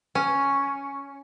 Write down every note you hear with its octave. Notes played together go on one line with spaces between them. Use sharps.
C#4